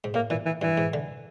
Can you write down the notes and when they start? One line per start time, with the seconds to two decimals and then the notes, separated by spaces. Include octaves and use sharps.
0.04 G#2
0.14 A2 A#3
0.30 A#2 E3
0.46 E3
0.62 G2 E3
0.77 G#2
0.94 D3